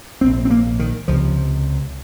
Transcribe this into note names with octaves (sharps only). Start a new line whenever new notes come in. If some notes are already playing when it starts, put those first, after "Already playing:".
A#1 G#2 C4
C4
A#3
D#3
C#2 C3 F3